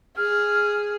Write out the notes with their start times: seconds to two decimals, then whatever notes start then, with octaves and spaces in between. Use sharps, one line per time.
0.17 G#4 F6